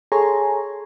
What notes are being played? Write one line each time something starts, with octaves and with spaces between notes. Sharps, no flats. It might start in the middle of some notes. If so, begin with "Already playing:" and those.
G#4 A4 C#5 G#5 A#5 C6